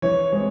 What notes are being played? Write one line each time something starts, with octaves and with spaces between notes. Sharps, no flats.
E3 C#5
G#3 C4 C#5